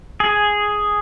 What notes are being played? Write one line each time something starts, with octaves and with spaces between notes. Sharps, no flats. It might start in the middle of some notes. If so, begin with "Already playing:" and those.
G#4